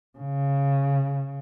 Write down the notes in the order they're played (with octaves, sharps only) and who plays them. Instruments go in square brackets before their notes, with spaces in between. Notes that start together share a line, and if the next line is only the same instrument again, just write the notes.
[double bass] C#3